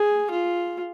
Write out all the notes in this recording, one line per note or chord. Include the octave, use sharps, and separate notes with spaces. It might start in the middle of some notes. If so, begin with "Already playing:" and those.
Already playing: G#4
F4